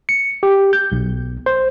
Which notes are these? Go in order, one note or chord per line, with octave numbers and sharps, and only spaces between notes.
C#7
G4
G6
B1
C5